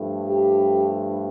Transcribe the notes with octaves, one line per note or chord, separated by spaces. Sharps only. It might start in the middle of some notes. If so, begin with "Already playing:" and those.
Already playing: G2 F3 A3
G4